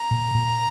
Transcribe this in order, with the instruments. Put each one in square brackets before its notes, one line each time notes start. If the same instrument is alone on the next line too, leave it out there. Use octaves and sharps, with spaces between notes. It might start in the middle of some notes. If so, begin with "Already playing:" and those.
Already playing: [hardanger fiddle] A#5
[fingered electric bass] A#2
A#2